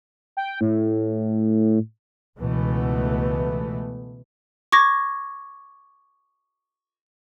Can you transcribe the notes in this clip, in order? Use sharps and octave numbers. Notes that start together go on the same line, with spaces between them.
G5
A2
C#2 B2 E3 A3 B3
C#6 D6 G#6 A#6